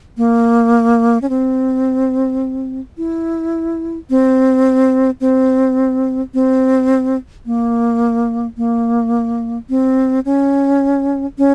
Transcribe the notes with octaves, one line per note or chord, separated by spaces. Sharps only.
A#3
C#4
C4
E4
C4
C4
C4
A#3
A#3
C4
C#4
C#4